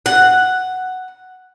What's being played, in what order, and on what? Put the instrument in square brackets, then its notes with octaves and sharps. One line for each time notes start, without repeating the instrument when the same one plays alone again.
[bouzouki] F#5